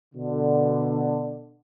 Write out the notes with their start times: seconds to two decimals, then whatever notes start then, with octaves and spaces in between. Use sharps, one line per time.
0.15 B2 D3